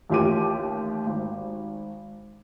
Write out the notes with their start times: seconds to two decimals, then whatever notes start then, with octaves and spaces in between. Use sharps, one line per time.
0.10 A1 D#2 F4 G4 D6 D#7
1.07 G#1